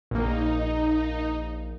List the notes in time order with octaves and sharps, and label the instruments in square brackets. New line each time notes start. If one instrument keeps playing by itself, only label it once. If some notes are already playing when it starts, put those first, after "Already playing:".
[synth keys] A#1 A#3 [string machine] D#4